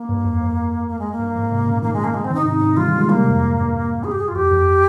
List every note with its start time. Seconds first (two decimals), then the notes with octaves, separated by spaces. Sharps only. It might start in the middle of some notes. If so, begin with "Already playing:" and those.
Already playing: A#3
0.09 G2
0.24 F2
0.41 F2
0.88 A#3
0.99 G#3
1.12 A#3
1.19 G2
1.35 F2 G#2
1.51 G#2 C3
1.66 A#2 C#3
1.82 C3 D#3 A#3
1.93 G#3
1.99 C#3 F3
2.04 A#3
2.14 C#3 F3 G#3
2.25 C4
2.30 C3 D#3 D#4
2.45 G#2 C3 D#4
2.61 G#2 C3
2.77 D#3 G3 F4
2.88 D#3 G3
2.98 F3 G#3
3.09 D#3 G3 A#3
3.19 G#2 C3
3.30 F2 G#2
3.40 F2
3.57 G2
4.04 G#4
4.11 G4
4.19 G#4
4.28 F4
4.35 F2 G4
4.51 F2